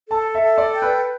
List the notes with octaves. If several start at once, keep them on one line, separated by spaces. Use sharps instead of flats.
A4 A5
E5
A4
D5
G5
B4